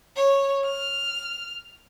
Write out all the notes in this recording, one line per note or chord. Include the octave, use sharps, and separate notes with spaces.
C#5
F6